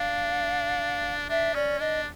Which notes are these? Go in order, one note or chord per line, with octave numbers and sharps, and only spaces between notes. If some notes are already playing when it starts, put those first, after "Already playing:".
Already playing: D4 F5
D4 E5
C#4 D5
D4 D#5